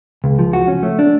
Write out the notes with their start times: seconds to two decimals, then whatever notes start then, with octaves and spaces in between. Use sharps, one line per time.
0.24 C#2
0.39 F3
0.53 F#4
0.68 C#4
0.83 A3
0.99 D4